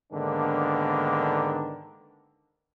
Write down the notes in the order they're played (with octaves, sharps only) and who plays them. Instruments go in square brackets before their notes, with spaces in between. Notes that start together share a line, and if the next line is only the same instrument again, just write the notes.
[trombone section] G#2 D3 D#3 A#3 B3 D4